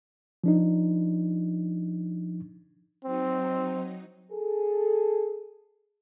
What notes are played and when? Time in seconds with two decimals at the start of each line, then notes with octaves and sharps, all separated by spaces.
0.44 F3 D4 D#4
3.04 F#3 C4 D#4
4.31 G#4 A4